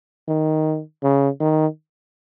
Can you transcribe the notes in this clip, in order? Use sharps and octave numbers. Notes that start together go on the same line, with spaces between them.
D#3
C#3
D#3